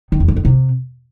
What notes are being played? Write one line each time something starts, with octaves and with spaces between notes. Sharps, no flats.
D#3
E2
E3
F2
C3